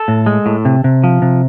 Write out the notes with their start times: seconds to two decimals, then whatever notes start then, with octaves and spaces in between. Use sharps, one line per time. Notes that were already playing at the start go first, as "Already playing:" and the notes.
Already playing: A4
0.08 A2
0.26 G#3
0.46 A2
0.65 C3
0.84 C3
1.04 F3
1.22 C3